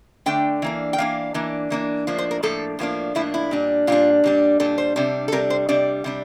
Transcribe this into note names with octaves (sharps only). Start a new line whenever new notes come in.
D3 A3 D4 G5
E3 A#3 D4
G5
E3 A#3 D4 F5
E3 A#3 D4
E3 A#3 D4
A2 F3 A#3 D4
C5
A#4
A2 F3 A#3 D4 A4
A2 F3 A#3 D4
A2 F3 A#3 D4 E4
E4
A#2 G3 D4
A#2 G3 D4 F4
A#2 G3 D4
A#2 G3 D4 A4
C5
C3 G3 D4
A4
C3 G3 D4 A#4
C5
C3 G3 D4 D5
C3 G3 D4